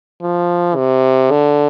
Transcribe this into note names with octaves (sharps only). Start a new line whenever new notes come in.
F3
C3
D3